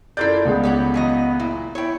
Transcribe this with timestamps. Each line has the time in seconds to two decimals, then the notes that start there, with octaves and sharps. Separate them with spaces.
0.17 F#2 E4 F4 A4 A#4 D5 G6
0.45 C#2 B3 G#4
0.64 G4 C#5 F#5
0.94 E3 F#3 D#5
1.40 A#2 E4
1.75 E4 C#5 G5